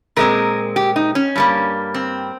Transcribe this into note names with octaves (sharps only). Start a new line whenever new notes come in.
A#2 G#3 C4 A#4
G4
D#4
C#4
G2 G3 A#3
C4